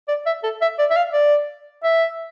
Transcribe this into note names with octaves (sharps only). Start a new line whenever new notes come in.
D5
E5
A4
E5
D5
E5
F5
D5
E5